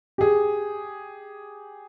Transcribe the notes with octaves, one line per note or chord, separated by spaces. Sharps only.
G4 G#4